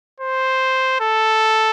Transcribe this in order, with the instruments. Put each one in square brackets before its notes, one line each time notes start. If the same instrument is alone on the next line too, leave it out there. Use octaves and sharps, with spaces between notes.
[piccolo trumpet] C5
A4